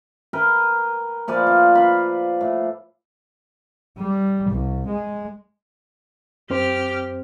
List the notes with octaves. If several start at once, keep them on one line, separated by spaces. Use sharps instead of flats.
A#4 B4 G5
A#2 F3 B4 D5
F4
F5 B5
A2
G3
C2
G#3
F#2 C4 G4 C5 F6